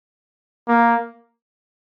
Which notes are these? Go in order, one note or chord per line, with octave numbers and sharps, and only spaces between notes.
A#3